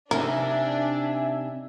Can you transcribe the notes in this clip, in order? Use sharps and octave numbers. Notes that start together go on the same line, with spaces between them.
C3 D4 D#4 A#4 E5 G#5